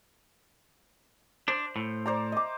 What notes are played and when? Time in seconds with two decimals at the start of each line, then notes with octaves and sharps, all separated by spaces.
1.48 D4 C5
1.76 A2
2.06 C5 D5 A#5
2.32 D#5 D6